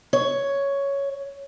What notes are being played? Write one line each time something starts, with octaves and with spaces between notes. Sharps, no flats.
C#5